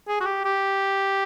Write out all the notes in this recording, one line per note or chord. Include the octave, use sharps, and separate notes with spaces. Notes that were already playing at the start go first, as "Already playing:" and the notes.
G#4
F#4
G4
G4